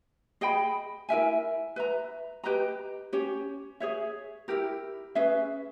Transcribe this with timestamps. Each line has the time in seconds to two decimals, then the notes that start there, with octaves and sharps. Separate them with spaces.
0.41 G#4 D#5 G5 B5
1.09 E4 A#4 E5 G#5
1.76 B4 E5 A#5
2.44 G4 B4 D#5 A#5
3.13 C#4 G4 C#5
3.80 G#4 C#5 E5
4.48 E4 G4 A#4
5.15 C#4 G#4 B4 E5